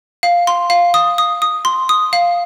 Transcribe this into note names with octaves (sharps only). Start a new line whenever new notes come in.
F5
C6
F5
D#6
D#6
D#6
C6
D#6
F5